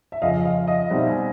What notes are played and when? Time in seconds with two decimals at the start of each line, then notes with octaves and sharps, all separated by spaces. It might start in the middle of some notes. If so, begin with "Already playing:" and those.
0.12 E5
0.22 F2 C#3 F3 D#5 F5
0.45 D#5 F5
0.67 D#5 F5
0.90 B2 G3 C4 D#4 E5 F#5
1.07 F#5 G#5